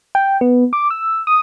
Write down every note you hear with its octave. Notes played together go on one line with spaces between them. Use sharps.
G5
B3
D6
E6
D#6